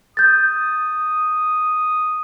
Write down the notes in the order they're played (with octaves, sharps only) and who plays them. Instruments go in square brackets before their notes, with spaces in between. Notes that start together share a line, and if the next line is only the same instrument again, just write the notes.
[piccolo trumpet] D#6 [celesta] G6 A6